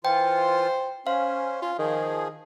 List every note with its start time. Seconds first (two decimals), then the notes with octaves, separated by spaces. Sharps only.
0.05 E3 F4 C5 G5
1.07 C#4 C5 F5
1.62 F4
1.79 D#3 F3 G#4